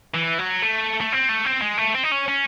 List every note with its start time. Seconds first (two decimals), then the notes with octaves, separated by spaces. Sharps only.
0.14 E3
0.38 F#3
0.62 A3
1.01 A3
1.13 C4
1.29 A3
1.45 C4
1.62 G#3
1.78 A3
1.94 C4
2.04 D#4
2.12 C#4
2.28 C#4